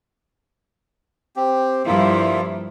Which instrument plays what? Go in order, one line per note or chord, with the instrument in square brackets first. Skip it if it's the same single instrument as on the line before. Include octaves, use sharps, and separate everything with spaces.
[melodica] C4 G4
[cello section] G2 F3 E4 [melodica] A#3 F4